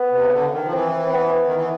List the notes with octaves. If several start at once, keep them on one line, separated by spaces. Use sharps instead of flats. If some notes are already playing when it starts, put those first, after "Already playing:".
Already playing: B3
C3
C#3
D3
D#3
F3
E3 C4
C4
C4
B3
D#3
E3